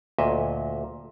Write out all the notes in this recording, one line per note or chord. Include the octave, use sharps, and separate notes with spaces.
D2 A#2 D#5 E5